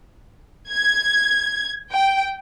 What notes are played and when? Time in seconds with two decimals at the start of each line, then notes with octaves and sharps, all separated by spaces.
0.69 G#6
1.92 G5